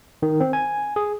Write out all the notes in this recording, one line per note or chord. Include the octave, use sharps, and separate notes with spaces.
D#3
C4
G#5
G#4